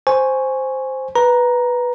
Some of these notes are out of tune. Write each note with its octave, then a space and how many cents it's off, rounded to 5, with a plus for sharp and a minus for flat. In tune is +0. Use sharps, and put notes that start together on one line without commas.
C5 +0 G#5 +0 C#6 +0
B4 -5 A#5 +10